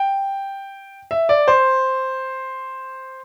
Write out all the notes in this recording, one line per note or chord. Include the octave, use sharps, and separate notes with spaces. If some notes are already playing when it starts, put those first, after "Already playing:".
Already playing: G5
E5
D5
C5